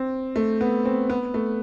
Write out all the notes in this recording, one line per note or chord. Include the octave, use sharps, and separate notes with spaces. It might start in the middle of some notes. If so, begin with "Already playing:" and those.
Already playing: C4
A3
B3
C4
B3
A3